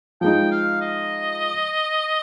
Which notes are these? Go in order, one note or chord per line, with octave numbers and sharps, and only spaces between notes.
F3 G#3 D#4 G5
F5
D#5